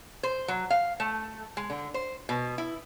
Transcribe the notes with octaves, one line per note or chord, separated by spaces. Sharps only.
C5
F#3
F5
A3
G#3
D3
C5
B2
E4